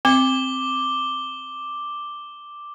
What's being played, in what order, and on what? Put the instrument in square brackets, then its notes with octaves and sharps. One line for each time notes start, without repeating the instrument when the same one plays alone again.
[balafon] C4 [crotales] D6 G7